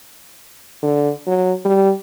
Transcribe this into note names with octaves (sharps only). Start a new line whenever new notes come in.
D3
F#3
G3